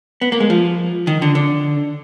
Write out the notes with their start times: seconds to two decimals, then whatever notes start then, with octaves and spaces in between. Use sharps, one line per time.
0.21 B3
0.32 A#3
0.40 G#3
0.50 F3
1.07 D#3
1.22 D3
1.35 D3